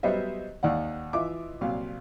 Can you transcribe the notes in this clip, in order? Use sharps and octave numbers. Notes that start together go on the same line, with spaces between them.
F#3 G3 B3 C5 D#5 E5
D#2 D#3 D5 F#5
E3 F4 D#5 E5 D6
C2 A#2 F#3 F5